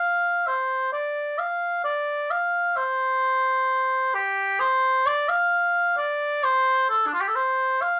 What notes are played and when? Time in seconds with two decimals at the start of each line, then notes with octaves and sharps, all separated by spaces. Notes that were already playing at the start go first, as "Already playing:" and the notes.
Already playing: F5
0.47 C5
0.93 D5
1.39 F5
1.85 D5
2.31 F5
2.77 C5
4.14 G4
4.60 C5
5.06 D5
5.29 F5
5.98 D5
6.44 C5
6.89 A4
7.06 D4
7.14 F4
7.21 G4
7.28 A4
7.35 C5
7.82 F5